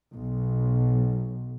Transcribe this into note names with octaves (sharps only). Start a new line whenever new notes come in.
B1